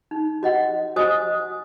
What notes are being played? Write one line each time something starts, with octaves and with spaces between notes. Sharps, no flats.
D#4
F#4 D#5 F#5
F#4 C5 D#5 G#5 D#6